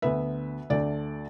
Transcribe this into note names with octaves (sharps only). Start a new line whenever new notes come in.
D2 D3 B3 B4 E5
D2 D3 A3 D5